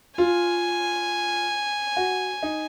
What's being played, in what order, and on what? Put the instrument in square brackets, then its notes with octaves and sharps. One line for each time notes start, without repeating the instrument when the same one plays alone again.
[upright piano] F4 [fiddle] G#5
[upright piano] F#4
D#4